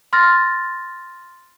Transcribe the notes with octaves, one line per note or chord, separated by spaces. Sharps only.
C6 F6 A6 A#6